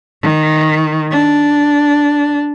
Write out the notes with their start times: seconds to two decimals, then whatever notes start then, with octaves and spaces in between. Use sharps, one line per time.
0.22 D#3
1.11 D4